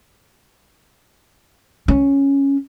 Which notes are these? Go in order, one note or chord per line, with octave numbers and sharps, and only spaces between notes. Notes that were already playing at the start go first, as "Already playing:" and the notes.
C#4